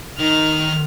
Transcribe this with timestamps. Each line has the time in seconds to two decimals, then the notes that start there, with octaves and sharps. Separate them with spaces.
0.19 D#3 D#4 F6